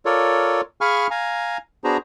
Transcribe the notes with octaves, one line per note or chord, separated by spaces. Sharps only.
F4 A4 A#4 C#5 D5
G#4 F5 G#5 B5 C#6 F6
F5 G#5 A#5
B3 D4 F#4 G#4 C5 A#5